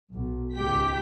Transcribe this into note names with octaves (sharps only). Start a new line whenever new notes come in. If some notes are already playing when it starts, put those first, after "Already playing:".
B1
C#2 G#2 G#3 G4 G5 B6